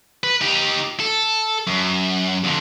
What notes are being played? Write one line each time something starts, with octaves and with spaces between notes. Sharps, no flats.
B4
D#4 G4
A4
F#2
F2 D3